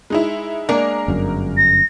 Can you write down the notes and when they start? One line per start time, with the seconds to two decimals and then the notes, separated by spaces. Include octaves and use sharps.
0.10 G#3 D#4 E4
0.69 G#3 A#3 D4 A#4
1.08 G1 F#2
1.57 A#6